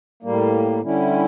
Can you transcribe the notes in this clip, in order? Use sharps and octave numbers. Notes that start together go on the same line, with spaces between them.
A2 G3 A#3
D3 G3 C#4 E4